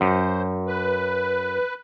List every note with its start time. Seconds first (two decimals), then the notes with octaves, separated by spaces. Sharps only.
0.01 F#2 C5
0.67 B4